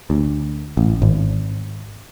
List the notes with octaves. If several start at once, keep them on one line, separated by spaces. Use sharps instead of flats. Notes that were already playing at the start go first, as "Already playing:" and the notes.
D2
A1
G#1